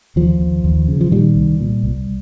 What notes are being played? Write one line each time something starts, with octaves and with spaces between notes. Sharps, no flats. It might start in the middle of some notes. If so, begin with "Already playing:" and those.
D#2 F3
D#2
D#2
C#3
F3
A#2 D#3 G3
C2
A#2
C2